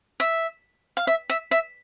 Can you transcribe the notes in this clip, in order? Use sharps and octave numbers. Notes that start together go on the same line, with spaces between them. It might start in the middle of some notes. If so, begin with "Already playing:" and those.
E5
F5
E5
E5
E5